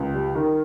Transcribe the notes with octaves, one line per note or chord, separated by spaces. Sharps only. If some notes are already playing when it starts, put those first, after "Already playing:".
Already playing: C#2
G3
D#3 A#4